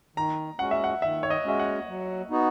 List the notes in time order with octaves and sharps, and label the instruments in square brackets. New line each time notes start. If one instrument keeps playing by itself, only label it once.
[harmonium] D#3 [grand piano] A#5
[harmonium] G#3 C#4 F#4 [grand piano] F#5
[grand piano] E5
F#5
[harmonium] D#3 [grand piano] E5
[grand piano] C#5
D#5
[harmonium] G#3 C#4 F#4 [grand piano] E5
[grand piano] F#5
[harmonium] F#3
B3 D#4 F#4